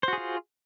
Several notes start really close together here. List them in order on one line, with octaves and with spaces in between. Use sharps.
C5 F#4 G#4 F4